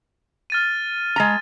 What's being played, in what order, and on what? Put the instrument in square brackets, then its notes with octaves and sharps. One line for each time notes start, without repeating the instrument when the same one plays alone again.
[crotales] F6 A6 D#7
[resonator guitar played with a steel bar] G#3 A#5